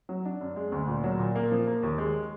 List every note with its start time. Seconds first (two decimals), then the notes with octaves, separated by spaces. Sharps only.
0.09 F#3
0.25 D4
0.41 F#2
0.56 G#3
0.72 D2
0.88 A#2
1.04 F#3
1.19 A#2
1.36 A#3
1.52 F3
1.67 A#3
1.83 D#2
1.98 G#3